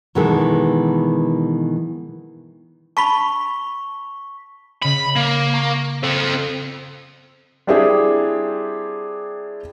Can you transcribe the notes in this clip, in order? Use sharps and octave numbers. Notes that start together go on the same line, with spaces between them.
B2 D#3 E3 G#3 A4
A5 B5 C#6 B6 G7
C#3 D#5 B5
A#3
A#5 C#6
C4 A4
G3 C4 D4 E4 G4 G#4